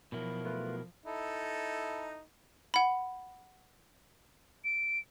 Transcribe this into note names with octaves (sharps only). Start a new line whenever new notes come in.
B2 F3 F#3 E4 A#4
A3 F4 B4
D#4 E4 A4
F#5 B5
D7